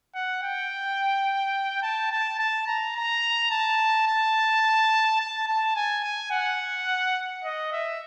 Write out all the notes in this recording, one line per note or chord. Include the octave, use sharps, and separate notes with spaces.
F#5
G5
A5
A5
A5
A#5
A#5
A5
A5
A5
A5
G#5
G#5
F#5
D#5
E5